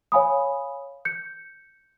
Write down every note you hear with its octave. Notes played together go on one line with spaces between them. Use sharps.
C#5 F5 G#5 B5 D#6
G6 C#7